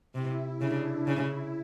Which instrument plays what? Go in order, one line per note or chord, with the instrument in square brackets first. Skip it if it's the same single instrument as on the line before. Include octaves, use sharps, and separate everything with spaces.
[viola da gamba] C3 [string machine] E4
[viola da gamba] C#3 [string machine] D4
[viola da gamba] C#3 [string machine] E4